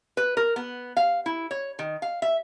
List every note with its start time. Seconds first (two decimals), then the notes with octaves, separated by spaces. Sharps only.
0.17 B4
0.37 A#4
0.56 B3
0.97 F5
1.26 E4
1.51 C#5
1.79 D#3
2.02 F5
2.22 E5